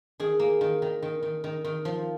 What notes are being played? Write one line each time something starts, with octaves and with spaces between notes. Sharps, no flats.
D#3 G#4
A#3
D#3
D#3
D#3
D#3
D#3
D#3
F3